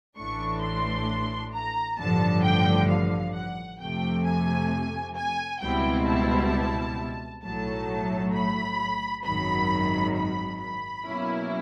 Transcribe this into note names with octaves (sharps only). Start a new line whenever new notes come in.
A1 A2 E3 A3 D4 C#6
C6
A#5
A1 G2 D3 F3 A5
G5
F5
F#5
F2 C3 F3 A3 G5
G#5
G#5
C#2 B2 G3 C4 E4 G5
A5
B1 A2 F#3 A3 A5
B5
G#1 F#2 D#3 F#3 B5
B5
B5
B2 F#3 A#3 C#4 E4